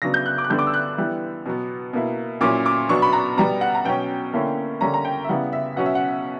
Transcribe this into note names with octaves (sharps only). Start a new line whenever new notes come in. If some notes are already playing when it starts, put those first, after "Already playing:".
C#3 F#3 B3 D4 A#6
G6
F#6
D6
F#6
D3 G3 B3 D4 G6
D6
E6
F#6
E3 G3 B3
B2 F#3 B3
B2 A#3 E4
A#2 F#3 C#4 E4 D6
D6
B2 F#3 B3 D4 C#6
B5
A#5
B2 G3 B3 A#5
F#5
A#5
B2 F#3 C#4 G5
D3 A#3 C#4 E4
D3 G3 A#3 C#4 A#5
A#5
G5
E5
C#3 G3 B3 E4 F#5
E5
B2 F#3 C#4 F#5
E5
F#5